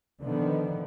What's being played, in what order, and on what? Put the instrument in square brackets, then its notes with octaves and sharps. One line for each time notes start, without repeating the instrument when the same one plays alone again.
[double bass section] A#2 D3 D#3 F3 B3